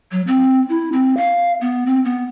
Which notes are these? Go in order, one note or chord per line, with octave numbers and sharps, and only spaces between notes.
F#3
C4
E4
C4
F5
B3
C4
B3